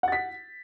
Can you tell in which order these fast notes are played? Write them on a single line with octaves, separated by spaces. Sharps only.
F#5 A6 B6